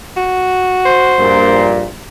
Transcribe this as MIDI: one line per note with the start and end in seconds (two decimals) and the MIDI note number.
0.17 1.33 66
0.86 1.67 72
1.19 1.87 34
1.19 1.87 43
1.19 1.87 46